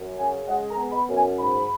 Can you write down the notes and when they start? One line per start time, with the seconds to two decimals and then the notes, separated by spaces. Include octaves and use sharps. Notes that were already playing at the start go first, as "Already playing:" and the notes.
Already playing: F#2
0.17 C#3 G#5
0.46 G#3 F#5
0.69 A#5
0.77 B3
0.92 B5
1.07 F#2
1.14 G#5
1.37 G#2 B5